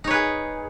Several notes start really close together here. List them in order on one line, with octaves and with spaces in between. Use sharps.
D#4 C#5 B4 G#4